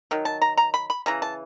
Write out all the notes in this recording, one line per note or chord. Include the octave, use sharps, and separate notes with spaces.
D#3 F#3
A5
A#5
A#5
B5
B5
C#3 E3 A#5
A5